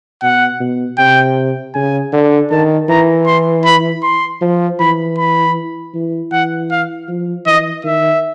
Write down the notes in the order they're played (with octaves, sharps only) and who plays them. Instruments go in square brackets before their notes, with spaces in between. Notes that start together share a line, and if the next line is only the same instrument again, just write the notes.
[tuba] B2 [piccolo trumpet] F#5
[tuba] B2
[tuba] C3 [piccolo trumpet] G5
[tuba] C#3 [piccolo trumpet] G#5
[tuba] D3
[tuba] D#3 [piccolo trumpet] A5
[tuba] E3 [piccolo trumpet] A#5
[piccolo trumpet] C6
B5
C6
[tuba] F3
[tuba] E3 [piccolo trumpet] B5
[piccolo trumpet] B5
[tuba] E3
[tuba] E3 [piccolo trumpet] F#5
[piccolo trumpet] F5
[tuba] F3
[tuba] E3 [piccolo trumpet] D#5
[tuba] D#3 [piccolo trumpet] E5